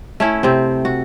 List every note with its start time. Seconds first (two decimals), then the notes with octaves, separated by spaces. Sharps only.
0.20 A3 C#4 E4
0.43 C3 C4
0.85 F#4